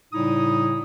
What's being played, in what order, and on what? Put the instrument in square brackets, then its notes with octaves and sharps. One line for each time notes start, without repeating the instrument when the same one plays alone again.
[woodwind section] A2 C#3 G3 D#4 E4 D#6